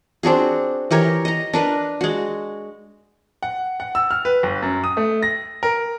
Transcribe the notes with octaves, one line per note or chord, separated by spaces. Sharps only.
C4 D4 F#4 G#4
E3 G4 A#4 C#5
D#5 A#5
D4 A#4 B4
G#3 F#4
F#5
F#5
E6
F6
B4
G1
F#2
D#6
A3
A#6
A#4